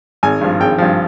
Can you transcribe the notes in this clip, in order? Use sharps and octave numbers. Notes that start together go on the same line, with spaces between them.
G#1 G#5
G2 F3
G#1 G5
G2 F3